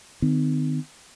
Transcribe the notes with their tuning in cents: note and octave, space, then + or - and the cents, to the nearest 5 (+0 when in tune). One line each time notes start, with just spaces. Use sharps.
D#3 -25 B3 +45